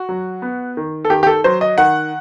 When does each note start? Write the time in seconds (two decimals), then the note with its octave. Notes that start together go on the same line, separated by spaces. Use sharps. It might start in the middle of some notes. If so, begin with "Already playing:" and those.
Already playing: F#4
0.09 F#3
0.42 B3
0.77 D#3
1.05 A4
1.10 D#3 G4
1.23 G4
1.27 A4
1.44 F#3 C5
1.61 D#5
1.78 D#3 F#5